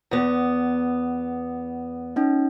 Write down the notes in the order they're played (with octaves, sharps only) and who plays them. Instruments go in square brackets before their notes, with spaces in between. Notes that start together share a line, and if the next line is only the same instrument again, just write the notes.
[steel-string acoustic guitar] E2 B3
[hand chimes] C#4 D#4